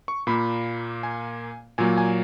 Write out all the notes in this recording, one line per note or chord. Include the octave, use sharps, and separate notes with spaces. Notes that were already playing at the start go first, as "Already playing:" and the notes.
C#6
A#2 A#3 B5
G#5
A#2 F#3 A#3 G#5
G#5